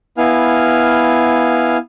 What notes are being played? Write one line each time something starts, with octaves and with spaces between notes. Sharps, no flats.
B3 E4 F5 G#5 F6